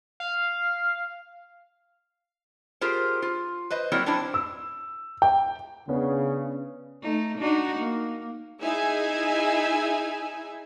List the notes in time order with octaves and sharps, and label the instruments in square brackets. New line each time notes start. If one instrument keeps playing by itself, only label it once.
[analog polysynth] F5
[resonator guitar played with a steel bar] F4 G4 G#4 A#4 C5
F4
B4 C5 D#5
F#3 A#3 C4 E4 A#4 D5
C4 D4 E4 C5
[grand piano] E6
G5
[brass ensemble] C#3 [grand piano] B3 C#4 D4
[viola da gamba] A3 D#4
D4 D#4 F#4
A#3
[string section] D#4 E4 G#4 E5 G#5